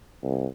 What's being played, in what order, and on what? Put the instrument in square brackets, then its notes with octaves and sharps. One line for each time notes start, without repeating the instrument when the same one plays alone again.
[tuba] C2